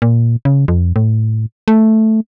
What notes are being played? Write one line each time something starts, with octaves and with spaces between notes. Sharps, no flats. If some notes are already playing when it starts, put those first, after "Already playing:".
A#2
C#3
F2
A2
A3